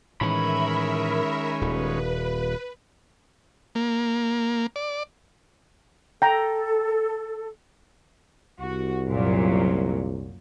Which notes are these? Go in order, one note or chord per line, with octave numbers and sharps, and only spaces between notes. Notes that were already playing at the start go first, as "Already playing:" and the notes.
A2 D#3 E3 G#3 C#4 A#4 E5 B5
D#1 B4
A#3
D5
A4 G5 A#5
C2 F#4
F#2 A#2 F#3